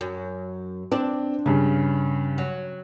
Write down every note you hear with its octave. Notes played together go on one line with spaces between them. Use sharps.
F#2
C4 D4
G2 C#3
F#3